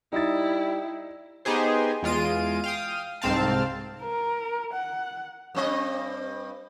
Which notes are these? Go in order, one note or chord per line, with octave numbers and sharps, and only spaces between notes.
G3 D#4 E4 A6
B3 D#4 G4 G#4 C5
E2 G#3 F4 D7 D#7
F5 G5 D#6
C2 G#2 C4 F5 A5
A#4
F#5
G2 C4 D#5